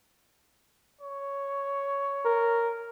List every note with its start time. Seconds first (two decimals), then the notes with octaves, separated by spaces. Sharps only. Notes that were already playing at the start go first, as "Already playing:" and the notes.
1.01 C#5
2.25 A#4